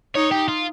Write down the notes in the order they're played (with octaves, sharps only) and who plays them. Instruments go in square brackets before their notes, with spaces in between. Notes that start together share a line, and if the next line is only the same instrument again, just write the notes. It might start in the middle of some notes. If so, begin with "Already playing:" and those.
[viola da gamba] D#4 [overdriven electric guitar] C#5
[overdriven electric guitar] G4
F4